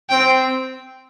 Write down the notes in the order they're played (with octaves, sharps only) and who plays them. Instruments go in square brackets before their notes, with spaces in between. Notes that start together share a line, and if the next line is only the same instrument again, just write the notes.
[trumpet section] C4 [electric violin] G5